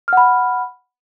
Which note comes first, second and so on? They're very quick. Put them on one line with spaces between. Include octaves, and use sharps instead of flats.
F6 F#5 B5